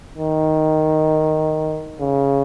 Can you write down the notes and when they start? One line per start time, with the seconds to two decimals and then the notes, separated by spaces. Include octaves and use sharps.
0.18 D#3
2.00 C#3